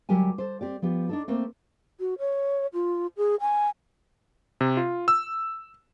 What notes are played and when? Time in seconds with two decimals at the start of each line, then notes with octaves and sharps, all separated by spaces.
0.09 D2 F#3 G3 G4 A#4 G#5
0.38 A4 C5
0.61 C4 G4 D5
0.82 F3 B3 G4
1.09 D4 D#4 A4
1.28 A3 A#3 C4
2.00 F#4
2.19 C#5
2.73 F4
3.17 G#4
3.40 G#5
4.61 C3
4.77 F4
5.08 E6